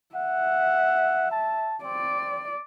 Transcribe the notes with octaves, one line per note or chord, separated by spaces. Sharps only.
E5 F#5
A5
C4 D5